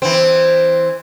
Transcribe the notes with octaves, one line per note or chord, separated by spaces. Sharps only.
E3 C4